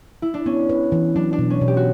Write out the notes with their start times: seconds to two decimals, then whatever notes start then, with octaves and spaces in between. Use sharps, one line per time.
0.22 E4
0.34 D4
0.46 B3 C#4
0.69 B4
0.92 E3
1.16 F#3 D4
1.33 D4
1.39 B2
1.50 C#4
1.61 B2
1.68 G4
1.77 F#4